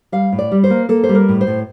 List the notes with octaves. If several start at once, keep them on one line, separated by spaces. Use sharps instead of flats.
G3 F5
A2
D5
G3
C5
A#3
A#3 A4
C5
G3
A#4
A2
C5
A2